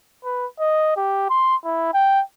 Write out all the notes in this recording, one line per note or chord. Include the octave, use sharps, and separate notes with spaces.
B4
D#5
G4
C6
E4
G5